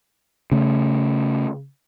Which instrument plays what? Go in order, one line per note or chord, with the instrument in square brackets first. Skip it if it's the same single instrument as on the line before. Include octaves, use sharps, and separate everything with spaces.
[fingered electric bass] C#3 A3